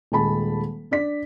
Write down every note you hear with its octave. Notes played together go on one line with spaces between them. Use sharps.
D#1 G#3 A5 B5
D4 D5 B6